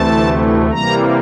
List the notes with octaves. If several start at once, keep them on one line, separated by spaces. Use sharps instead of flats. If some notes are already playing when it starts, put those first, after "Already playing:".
Already playing: D2 C3 E3 A3 A5
C3 E3 G3 A#3 A#5